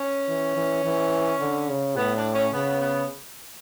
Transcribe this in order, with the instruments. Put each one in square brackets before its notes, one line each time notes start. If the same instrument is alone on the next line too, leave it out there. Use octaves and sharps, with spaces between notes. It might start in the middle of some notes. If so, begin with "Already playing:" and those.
Already playing: [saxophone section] C#4
[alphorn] E3
E3
E3
D3
C#3
[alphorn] A2 [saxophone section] B3
[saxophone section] D4
C#4
[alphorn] C#3 [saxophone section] B3
[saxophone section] B3